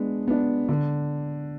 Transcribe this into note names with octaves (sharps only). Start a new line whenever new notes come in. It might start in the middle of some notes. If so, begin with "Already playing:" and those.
Already playing: G#3 B3 D4
B3 D4
D3